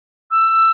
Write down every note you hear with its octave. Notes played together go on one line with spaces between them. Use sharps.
E6